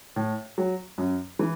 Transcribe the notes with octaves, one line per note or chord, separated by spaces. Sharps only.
A2
F#3
F#2
E3